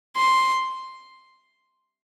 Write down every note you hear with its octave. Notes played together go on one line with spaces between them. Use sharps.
C6